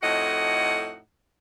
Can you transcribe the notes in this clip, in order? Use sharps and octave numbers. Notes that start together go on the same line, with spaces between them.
F2 A2 D#4 F#4 D#5 F#5